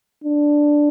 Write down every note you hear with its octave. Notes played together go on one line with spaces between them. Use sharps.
D4